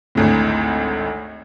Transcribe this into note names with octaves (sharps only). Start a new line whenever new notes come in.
G#1 D2 A2